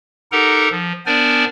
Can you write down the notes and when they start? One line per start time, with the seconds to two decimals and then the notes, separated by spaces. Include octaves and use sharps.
0.32 D#4 G4 A4 A#4 F#5 A#5
0.71 F3
1.06 B3 D4 A#4 C5 D5 G#5